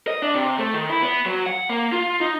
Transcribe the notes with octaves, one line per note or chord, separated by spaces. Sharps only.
D#5
D4
C3
A3
D#3
E4
B3
F#3
F#5
A#3
F4
D#4